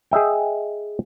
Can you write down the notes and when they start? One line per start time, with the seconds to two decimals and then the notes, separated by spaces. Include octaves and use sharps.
0.11 G#4 D#5 E5 G5